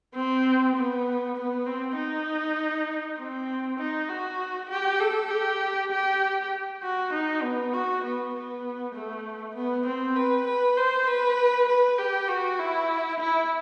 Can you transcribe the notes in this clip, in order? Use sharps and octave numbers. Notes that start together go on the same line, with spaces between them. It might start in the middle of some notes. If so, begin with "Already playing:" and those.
C4
B3
B3
C4
D#4
C4
D#4
F#4
G4
A4
G4
G4
F#4
D#4
B3
F#4
B3
B3
A3
B3
C4
B4
B4
C5
B4
B4
G4
F#4
E4
E4